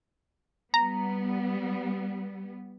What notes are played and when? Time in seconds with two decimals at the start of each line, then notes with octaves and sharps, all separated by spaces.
0.74 G3 B3 A#5